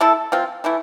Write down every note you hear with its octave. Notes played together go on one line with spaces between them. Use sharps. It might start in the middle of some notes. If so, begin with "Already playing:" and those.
A3 E4 A4
F3 C4 F4
E3 A3 E4